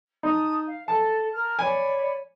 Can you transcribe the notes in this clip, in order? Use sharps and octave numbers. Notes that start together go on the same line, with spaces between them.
D#4 A5 D#6
F5
A4 A5
A#4 A5 F6
C#5 D5 G#5 B5